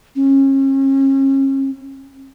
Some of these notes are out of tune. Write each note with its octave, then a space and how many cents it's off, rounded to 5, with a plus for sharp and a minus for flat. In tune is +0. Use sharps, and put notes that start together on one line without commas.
C#4 -35